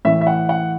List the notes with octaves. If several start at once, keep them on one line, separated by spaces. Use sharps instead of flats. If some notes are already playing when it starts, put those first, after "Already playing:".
A2 E3 E5
E5
F#5
F#5